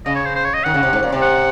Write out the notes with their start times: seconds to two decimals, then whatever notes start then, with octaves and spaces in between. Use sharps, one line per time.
0.06 C#3 D#5
0.15 C#5
0.25 C5
0.35 C5
0.44 C#5
0.54 D#5
0.64 D#3 F#5
0.74 C#3
0.83 C3
0.93 G#2
1.03 A#2
1.12 C3
1.22 F#5